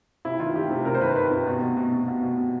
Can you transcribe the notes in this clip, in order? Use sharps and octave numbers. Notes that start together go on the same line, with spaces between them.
C3 E4
D#3 F4
D#3 G4
C3
C3 A#4
C5
D#3 B4
D#3 B4
C3
B2
B2
B2
B2
B2
B2
B2